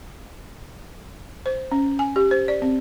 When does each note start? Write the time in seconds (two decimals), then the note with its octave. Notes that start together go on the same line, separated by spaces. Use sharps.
1.46 C5
1.72 C#4
1.99 G#5
2.16 G4
2.31 C5
2.48 D5
2.62 C4